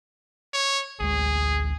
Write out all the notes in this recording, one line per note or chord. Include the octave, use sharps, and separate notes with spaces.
C#5
A1 D2 G#3 G#4